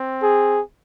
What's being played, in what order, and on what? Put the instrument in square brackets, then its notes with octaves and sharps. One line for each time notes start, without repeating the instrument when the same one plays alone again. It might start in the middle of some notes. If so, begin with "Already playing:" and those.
Already playing: [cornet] C4
[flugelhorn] G#4